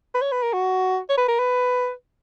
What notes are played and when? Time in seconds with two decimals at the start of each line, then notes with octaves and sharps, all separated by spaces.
0.15 B4
0.22 C#5
0.32 B4
0.43 A#4
0.53 F#4
1.10 C#5
1.18 B4
1.28 A#4
1.39 B4